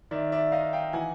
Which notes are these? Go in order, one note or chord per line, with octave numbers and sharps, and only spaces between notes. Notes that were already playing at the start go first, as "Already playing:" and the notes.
D#3 D5 E5
D5 E5
D#4 D#5 F5
F5 G5
E3 F#5 G#5